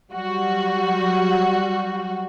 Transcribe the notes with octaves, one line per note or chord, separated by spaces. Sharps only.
F#3 G3 F#4